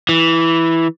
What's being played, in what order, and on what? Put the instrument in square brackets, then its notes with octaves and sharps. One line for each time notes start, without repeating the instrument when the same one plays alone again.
[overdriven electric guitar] E3